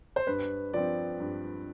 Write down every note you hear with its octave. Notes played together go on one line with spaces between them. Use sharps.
C5
G2 B4
F3 C4 D5
G2